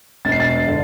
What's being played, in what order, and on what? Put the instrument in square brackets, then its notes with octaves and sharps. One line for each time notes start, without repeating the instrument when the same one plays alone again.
[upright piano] E1 A6
C7
A6
D3